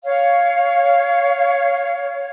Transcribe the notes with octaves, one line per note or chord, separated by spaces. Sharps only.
C#5 F5